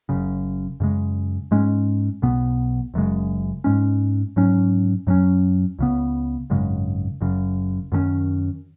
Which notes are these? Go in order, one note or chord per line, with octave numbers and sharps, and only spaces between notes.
F#1 F#2 C#3
F#2 C#3 G#3
G#2 G#3 C#4
B1 B2 B3
F#1 F#2 C#3 G#3
G#2 G#3 C#4
G#2 F#3 C#4
F#2 F#3 C#4
C#2 C#3 B3
G#1 F#2 C#3 G#3
F#1 F#2 C#3
F#2 D#3 F#3 C#4